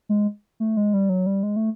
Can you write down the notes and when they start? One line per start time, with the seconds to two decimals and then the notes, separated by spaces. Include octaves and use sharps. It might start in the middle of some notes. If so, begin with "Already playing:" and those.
0.09 G#3
0.60 A3
0.77 G#3
0.94 G3
1.09 F#3
1.26 G3
1.43 G#3
1.56 A3